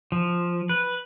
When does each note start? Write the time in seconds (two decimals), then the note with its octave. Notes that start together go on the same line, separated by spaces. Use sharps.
0.12 F3
0.69 B4